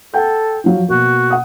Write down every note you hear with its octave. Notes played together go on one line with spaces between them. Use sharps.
A4 F#5 G5 G6
F3 F#3 F5
B2 A#3 F#4
F#5 D#6